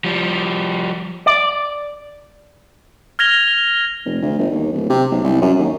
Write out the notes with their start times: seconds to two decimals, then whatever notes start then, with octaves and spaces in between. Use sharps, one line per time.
0.04 F3 G3
1.26 D5
3.19 F6 G#6 A#6 F7 G7
4.05 F1
4.22 D2
4.39 G1
4.51 D#2
4.73 D1
4.89 C3
5.12 B1
5.24 C2
5.41 F#2
5.59 D#2